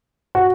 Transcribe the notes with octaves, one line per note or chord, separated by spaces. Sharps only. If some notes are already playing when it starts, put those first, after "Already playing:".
F#4